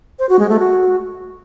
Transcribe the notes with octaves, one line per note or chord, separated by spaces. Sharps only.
C5
F#4
G#3
A3
F#4